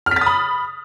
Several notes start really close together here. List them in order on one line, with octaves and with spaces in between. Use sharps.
F6 B6 A6 D#6 B5